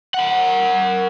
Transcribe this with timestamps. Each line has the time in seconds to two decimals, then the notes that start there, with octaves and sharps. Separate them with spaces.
0.14 A#4 F#5